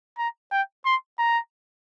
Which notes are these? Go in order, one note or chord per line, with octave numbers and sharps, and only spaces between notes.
A#5
G5
C6
A#5